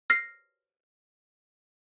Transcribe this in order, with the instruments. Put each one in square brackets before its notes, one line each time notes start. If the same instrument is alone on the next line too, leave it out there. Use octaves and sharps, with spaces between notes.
[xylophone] F6 A#6 C7